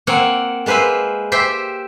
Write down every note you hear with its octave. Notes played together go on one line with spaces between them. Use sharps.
A#3 C4 C#5 F#5
G#3 A#3 B4 C5 E5
G4 C5 E5